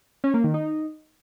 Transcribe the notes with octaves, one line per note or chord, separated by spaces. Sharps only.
C#4
A#3
D#3
D#4